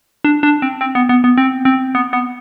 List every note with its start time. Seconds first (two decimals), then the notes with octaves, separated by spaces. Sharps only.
0.25 D4
0.43 D4
0.62 C4
0.81 C4
0.95 B3
1.09 B3
1.24 B3
1.38 C4
1.65 C4
1.95 B3
2.13 B3